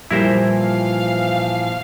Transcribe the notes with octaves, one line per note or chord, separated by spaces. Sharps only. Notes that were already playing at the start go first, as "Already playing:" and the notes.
A#2 E3 F3 G3 E4 A#4 C5
F5